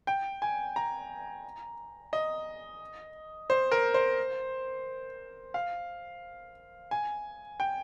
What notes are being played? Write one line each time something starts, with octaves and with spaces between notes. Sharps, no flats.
G5
G#5
A#5
D#5
C5
A#4
C5
F5
G#5
G5